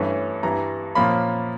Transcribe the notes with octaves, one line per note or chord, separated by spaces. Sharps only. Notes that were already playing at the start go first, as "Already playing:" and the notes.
Already playing: G2 E3 A3 C#4
G2 E3 G3 A#5
A#2 F3 A#3 C#4 B5